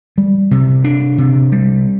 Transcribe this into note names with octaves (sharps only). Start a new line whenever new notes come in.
G3
C3
D4
C3
G3